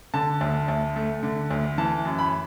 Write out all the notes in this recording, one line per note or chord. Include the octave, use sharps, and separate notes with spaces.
D3 A5
D2
D2
A3
D3
D2
E3 A5
F#2
B5